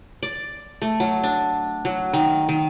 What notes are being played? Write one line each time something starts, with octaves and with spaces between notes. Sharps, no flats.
D5
A3
F#3
D4
F#3
D#3
D#3